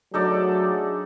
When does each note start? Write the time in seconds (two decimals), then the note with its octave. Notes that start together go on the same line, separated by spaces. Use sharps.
0.14 F#3 A3 D4 D#4 G#4 A4 D5